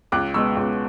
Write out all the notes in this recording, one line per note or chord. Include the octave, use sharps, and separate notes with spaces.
C#2 D6 F#6
B2 G#3 B3 C#6 E6
C#2